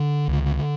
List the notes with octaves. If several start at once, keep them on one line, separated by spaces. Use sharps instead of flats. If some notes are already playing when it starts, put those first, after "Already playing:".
Already playing: D3
C#2